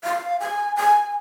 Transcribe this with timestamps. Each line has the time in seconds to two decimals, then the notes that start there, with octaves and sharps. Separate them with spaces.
0.04 F5
0.40 G#5
0.76 G#5